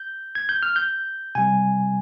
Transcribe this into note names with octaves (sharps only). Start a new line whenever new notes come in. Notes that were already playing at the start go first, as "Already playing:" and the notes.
Already playing: G6
G#6
G6
F6
G6
C3 G3 G#5